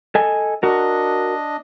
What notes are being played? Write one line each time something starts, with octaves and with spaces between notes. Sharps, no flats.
A4 D#5 G#5
D4 F#4 A#4 D#5